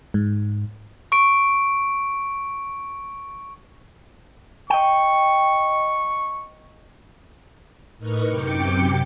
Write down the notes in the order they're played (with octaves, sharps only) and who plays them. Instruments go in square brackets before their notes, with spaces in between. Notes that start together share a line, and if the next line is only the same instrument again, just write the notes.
[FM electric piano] G#2
[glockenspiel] C#6 D7
[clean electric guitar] D#5 G5 [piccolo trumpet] C#6
[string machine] A2 D#4 A#4 B4 C#6
F#2 C3 G5 D6 C#7